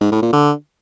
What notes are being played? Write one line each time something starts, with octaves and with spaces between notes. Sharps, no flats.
G#2
A2
A#2
D3